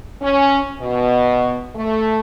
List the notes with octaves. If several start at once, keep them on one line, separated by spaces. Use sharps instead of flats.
C#4
B2
A3